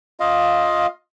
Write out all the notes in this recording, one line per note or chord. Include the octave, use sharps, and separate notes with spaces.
F4 D#5 F5